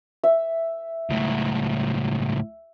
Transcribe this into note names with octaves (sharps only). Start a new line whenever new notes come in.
E5
C#2 A2